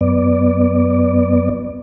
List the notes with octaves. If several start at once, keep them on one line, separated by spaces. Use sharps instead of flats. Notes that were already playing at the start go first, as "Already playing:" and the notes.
F#2 B3 D5